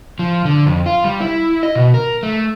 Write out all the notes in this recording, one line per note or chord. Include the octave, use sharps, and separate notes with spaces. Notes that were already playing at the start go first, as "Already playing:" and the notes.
F3
D3
F2
F4
G3
E4
D#5
B2
A#4
A3